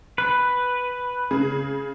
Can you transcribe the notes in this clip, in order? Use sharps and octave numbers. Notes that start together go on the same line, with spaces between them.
B4 F#6
C#3 G#4